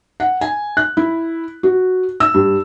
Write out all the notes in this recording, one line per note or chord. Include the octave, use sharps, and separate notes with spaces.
F#5
G#5
F#6
E4
F#4
E6
G2